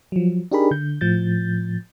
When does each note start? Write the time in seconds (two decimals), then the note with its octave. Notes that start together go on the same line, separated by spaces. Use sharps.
0.12 F3 F#3
0.52 D4 D#4 G4 G#4 A#4 B5
0.71 D3 G6
1.01 A2 F3 G6 A6